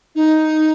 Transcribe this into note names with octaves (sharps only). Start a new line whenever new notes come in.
D#4